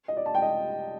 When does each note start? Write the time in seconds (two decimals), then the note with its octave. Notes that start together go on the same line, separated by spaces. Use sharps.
0.08 D#5
0.17 D5
0.26 A5
0.35 G5
0.42 D#5